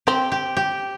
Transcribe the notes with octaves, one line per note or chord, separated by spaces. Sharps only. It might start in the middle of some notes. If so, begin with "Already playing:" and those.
C4 G4
G4
G4